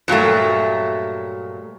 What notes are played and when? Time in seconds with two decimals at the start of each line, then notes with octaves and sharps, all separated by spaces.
0.08 G2 A#2 F#3 A3